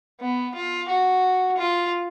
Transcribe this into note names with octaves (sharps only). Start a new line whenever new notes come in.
B3
F4
F#4
F4